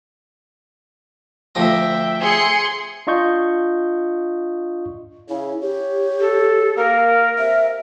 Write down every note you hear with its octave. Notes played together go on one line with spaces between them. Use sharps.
D2 F3 E5 G5 A#5
G#4 C6 C#7
D4 F4 D#5 C#6 G6
C#3 E4
G4 C#5
A4
A#3 A#4
C3 E5